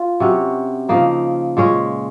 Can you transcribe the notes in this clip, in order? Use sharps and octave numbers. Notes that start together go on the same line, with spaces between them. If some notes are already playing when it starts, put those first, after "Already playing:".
Already playing: F4
C3 F#3 C#4
C#3 F3 A#3 D#4
A#2 G#3 C#4